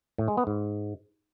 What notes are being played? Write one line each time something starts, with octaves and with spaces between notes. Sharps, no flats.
A2
G#3
B3
G#2